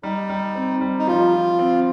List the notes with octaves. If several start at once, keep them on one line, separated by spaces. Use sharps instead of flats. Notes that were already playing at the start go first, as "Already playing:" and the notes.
G3 D#4
G3
C4
G3
D#4
F3 F4
F3
C4